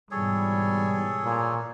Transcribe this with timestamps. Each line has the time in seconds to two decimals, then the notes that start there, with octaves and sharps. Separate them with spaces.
0.11 G#2 B2 E3 G3 G#4 A4 C#5
1.24 A#2